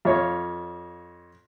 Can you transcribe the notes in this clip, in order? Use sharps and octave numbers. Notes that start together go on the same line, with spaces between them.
F2 C#5 F5